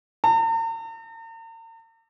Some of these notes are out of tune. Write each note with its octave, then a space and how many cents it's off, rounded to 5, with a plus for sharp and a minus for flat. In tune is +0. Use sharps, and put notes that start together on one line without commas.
A#5 -45